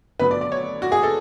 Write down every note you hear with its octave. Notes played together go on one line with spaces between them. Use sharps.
D3 F#3 B3 B4
D5
D5
C#5
F#4
G#4
A4